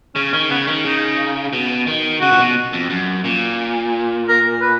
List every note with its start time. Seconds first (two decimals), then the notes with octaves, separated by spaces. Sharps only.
0.15 C#3 C#4
0.32 D#3 C#4
0.50 C#3 B3
0.67 D#3 C#4
0.84 C#3 D#4
1.53 B2
1.87 D#3
2.21 C#3 F#4
2.31 A#2
2.39 B2
2.73 F2
2.90 F#2
3.24 A#2
4.28 A#4
4.61 B4